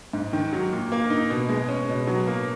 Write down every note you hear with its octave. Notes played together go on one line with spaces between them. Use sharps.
G#2
D#3
F#3
A#2
A#3
D#4
B2
G#3
C#4
B2
F#3
A#3